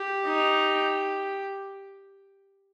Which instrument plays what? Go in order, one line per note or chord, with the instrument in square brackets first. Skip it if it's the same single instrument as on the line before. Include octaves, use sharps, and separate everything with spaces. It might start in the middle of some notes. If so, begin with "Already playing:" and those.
Already playing: [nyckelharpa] G4
[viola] D#4